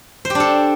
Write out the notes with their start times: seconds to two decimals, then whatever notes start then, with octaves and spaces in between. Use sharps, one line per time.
0.25 C5
0.30 G4
0.35 D4
0.40 A4